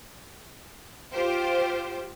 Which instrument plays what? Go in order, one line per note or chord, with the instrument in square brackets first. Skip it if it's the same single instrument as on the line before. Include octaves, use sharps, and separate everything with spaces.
[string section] F4 G4 C5